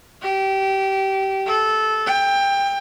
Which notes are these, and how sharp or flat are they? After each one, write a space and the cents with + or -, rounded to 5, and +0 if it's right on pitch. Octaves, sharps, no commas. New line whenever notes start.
G4 -20
A4 -15
G5 +20